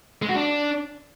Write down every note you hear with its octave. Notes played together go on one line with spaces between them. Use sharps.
G#3
F#4
D4